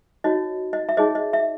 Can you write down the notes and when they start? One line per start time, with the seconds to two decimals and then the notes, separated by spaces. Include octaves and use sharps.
0.24 D#4 F#4 C#5 D#5
0.73 D#5
0.89 E5
0.97 D#4 G#4 C#5 D#5
1.15 D#5
1.33 E5